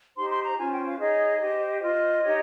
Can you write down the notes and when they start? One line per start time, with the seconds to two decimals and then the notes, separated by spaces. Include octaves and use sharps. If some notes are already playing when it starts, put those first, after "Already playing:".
0.15 D#4 G4 C5 C6
0.29 C6
0.43 A#5
0.56 C#4 F4 C5 G#5
0.71 G5
0.85 F5
0.98 D#4 G#4 C#5 D#5
1.40 G4 C5
1.81 F4 C5 D#5
2.21 D#4 G4 C#5